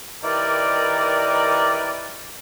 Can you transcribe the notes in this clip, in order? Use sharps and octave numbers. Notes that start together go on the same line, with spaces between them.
D#3 E4 G4 A#4 B4 D5